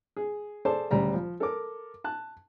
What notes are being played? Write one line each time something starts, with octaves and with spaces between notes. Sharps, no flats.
G#4
G#4 A4 C5 D5 A5
D2 C#3 G3 A#5
F3
A4 A#4 D6
A5 F#6